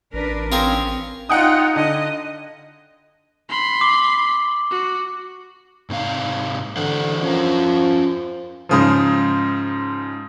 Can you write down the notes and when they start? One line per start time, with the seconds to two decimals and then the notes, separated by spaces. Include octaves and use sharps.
0.14 A1 D4 A#4 B4
0.52 C4 C#4 F4 G#4 A#4
1.30 D#4 F4 F#5 G5 D#6
1.76 D3 D#5
3.49 B5 C6
3.81 D6
4.71 F#4
5.90 G#2 C3 F5
6.76 D3 E3 C5 F#5
7.23 F3 C#4 A#4
8.69 G#2 C#3 F3